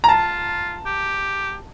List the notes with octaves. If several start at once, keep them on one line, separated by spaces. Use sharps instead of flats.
A#5
F4 A5
G4